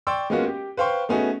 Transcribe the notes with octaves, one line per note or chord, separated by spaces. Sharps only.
D5 G5 C6 C#6 E6
G#3 A#3 B3 C#4 F4 F#4
G4
B4 C5 F5 G5 C6 C#6
A3 B3 C#4 D#4 F#4 G#4